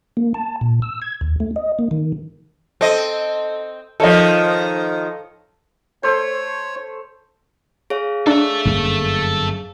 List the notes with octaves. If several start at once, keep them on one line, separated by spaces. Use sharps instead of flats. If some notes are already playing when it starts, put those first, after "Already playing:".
A#3
A5
A#2
E6
G#6
D#2
A3
D#5
A#3
D#3
C4 A4 D#5
D#3 F3 A4 C#5 D#5
A3 C5 C#5
G#4 C#5 F5
D4 A4 E5
G1 F#2 A#3